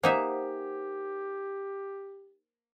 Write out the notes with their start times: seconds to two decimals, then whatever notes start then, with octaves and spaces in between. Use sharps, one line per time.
0.03 A#3 D#4 G4 C5 E5 F#5 G#5